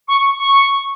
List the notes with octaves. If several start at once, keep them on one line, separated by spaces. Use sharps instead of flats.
C#6
C#6